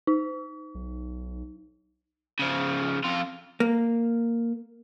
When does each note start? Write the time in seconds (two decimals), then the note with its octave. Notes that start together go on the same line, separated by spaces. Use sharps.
0.07 D#4
0.75 B1
2.39 C#3 F3
3.04 F2 F4
3.60 A#3